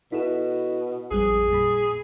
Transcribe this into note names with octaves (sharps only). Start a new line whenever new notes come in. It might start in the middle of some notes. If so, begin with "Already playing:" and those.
B2 E4 A4
A1 F2 G3 G#4
A#2 B5